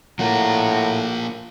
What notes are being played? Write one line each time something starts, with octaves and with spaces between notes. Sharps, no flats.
A2 F3 A#3 F4 F#5 A#5